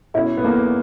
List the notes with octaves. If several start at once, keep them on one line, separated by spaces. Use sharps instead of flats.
B2 C#4 E4
B3
E2 A#3